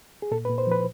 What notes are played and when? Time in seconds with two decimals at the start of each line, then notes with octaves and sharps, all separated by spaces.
0.22 G#4
0.31 A#2 A4
0.45 B4
0.50 A#2
0.58 C5
0.67 F3 B4